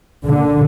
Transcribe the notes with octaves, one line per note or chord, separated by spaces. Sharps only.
A#2 D3